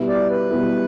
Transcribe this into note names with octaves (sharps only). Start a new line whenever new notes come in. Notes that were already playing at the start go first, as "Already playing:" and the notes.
Already playing: B2 G3 B3 E4
D5
B4
B2 G3 B3 E4